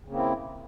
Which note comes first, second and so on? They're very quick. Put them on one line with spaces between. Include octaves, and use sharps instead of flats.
C#3 A#3 C4 E4